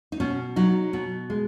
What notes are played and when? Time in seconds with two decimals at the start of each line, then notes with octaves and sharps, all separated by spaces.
0.12 D#4
0.20 B2 C#4
0.56 F#3 D#4
0.93 B2
1.30 G#3